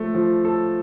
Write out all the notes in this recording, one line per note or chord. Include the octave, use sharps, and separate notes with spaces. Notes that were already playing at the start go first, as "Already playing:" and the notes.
Already playing: F3 A3
F3
A4